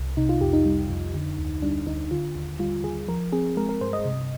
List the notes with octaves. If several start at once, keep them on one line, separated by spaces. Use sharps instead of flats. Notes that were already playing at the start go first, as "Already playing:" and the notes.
Already playing: C2
C3 D#4
F4
F2 G4
D#4
G3
F2
D3
D2
G3 D4
D2 D#4
D3 F4
D#2
G3 F4
D#2 G#4
F3 A#4
C4 G#4
G#3 A#4
A#4
G2 C5
D#5
C3